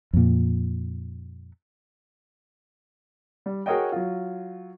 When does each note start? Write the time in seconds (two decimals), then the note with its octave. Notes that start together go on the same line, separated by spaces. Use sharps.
0.13 F2 A#2
3.46 G3
3.66 F#4 G#4 A#4 C#5 D#5 G5
3.92 F#3 F4